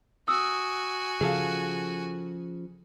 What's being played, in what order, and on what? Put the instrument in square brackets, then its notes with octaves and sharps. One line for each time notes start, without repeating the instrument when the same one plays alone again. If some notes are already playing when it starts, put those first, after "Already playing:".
[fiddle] F#4 G#5 [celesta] D#6 E6
[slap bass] C#3 F3 [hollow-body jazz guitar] G#4 A4 F5